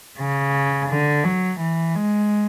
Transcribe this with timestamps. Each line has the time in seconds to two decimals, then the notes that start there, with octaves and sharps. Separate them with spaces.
0.20 C#3
0.89 D3
1.25 F#3
1.60 E3
1.95 G#3